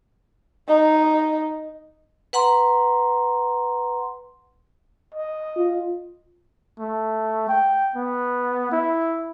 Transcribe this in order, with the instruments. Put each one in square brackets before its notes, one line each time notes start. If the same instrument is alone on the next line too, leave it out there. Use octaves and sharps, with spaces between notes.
[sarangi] D#4
[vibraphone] B4 F#5 A#5 C6
[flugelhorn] D#5
[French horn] F4
[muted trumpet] A3
G5
B3
E4